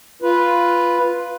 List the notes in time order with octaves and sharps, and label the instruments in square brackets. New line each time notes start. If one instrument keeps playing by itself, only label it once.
[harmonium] F4 B4